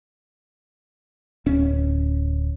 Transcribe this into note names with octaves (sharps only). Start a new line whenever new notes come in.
D1 C#4